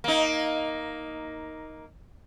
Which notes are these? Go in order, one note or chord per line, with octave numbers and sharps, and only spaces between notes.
A#3 D#4